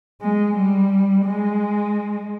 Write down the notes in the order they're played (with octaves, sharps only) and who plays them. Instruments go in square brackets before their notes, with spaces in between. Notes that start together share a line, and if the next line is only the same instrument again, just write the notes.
[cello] G#3
G3
G#3